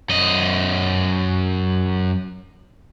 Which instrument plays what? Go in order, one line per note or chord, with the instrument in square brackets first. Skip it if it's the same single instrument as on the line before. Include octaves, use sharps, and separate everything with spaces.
[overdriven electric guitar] F#2 D#5